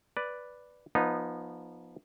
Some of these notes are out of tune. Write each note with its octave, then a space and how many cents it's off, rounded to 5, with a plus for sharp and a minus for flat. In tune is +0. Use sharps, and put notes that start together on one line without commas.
B4 +0 D5 +0
F3 +0 B3 -25 D#4 -15